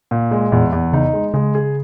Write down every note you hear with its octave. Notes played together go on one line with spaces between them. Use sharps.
A#2
G#3
E2 A#2
E2
C#3 D#4
G#3
C#3 G#3
G#4